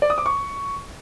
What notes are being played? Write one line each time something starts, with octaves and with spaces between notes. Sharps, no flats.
D5
D#6
D6
C#6